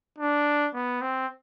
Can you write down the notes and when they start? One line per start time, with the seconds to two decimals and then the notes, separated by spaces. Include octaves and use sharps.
0.18 D4
0.74 B3
1.01 C4